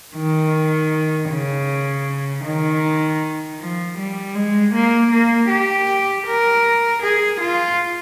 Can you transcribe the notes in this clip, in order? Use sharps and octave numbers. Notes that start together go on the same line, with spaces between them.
D#3
C#3
D#3
F3
G3
G#3
A#3
A#3
G4
A#4
G#4
F4